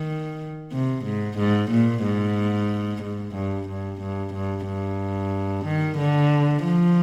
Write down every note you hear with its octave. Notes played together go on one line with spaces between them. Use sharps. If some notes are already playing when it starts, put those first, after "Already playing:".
Already playing: D#3
C3
G#2
G#2
A#2
G#2
G#2
G2
G2
G2
G2
G2
D#3
D3
F3